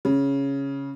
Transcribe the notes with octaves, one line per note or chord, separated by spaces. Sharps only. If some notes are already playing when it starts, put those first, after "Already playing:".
C#3